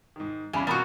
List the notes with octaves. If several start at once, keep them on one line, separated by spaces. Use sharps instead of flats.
G#2 D#3
E2 C#3 G3 G#5 B5
B2 A#3 C4 F4 F#4 B5 D#6 A6